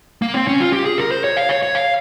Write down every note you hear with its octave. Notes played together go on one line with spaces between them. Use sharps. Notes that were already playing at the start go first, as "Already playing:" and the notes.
A#3
C4
C#4
F4
G4
G#4
A#4
C5
C#5
F5
C#5
C#5
F5